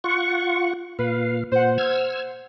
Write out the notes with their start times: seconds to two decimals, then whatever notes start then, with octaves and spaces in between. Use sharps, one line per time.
0.04 F4 F#5 C#6
0.99 A#2 B4 F5
1.52 A#2 C5 F#5
1.78 E6 F6 G#6